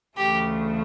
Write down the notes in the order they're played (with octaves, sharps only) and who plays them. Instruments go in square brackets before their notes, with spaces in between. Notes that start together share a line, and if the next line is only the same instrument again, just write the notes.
[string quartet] D2 C#3 E3 A3 [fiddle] G4